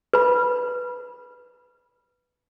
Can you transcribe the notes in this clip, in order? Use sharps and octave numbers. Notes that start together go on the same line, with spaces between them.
B4 B5